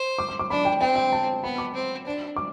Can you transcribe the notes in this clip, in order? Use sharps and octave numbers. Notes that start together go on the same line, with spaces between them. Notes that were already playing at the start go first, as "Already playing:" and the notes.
Already playing: C5
D6
D6
D6
D4 B5
G5
C4 G5
G5
A5
B3 B5
D6
C4
D4
D6